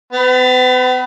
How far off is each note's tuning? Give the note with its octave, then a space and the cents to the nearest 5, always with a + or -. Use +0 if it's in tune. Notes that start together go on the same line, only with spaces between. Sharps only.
B3 +45 B5 +10